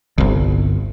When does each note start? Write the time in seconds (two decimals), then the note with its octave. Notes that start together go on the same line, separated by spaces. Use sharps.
0.18 G1 C2